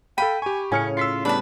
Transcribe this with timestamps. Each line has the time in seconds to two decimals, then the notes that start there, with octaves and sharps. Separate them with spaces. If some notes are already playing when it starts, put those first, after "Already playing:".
0.18 A4 F5 G5 B5 D#7
0.42 G4 G#5 C#6
0.72 A2 C#3 C#4 G#5 F6 C#7
0.97 F4 E6 B6 C7
1.25 G3 B3 D4 B4 A5